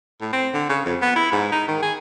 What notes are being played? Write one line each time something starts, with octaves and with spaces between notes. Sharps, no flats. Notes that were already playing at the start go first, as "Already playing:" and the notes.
A2
C4
D3
C#3
F2
B3
E4
G#2
D#4
D#3
G#4